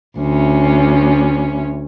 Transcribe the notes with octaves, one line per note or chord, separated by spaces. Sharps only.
D2 C#4